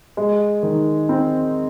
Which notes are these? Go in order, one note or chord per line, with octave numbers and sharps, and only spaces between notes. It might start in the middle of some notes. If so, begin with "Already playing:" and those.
G#3
D#3
C4